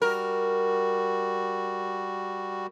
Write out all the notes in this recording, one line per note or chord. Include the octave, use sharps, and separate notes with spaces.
G3 F#4 A#4